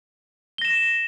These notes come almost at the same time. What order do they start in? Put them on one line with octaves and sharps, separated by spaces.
G7 A#6 E7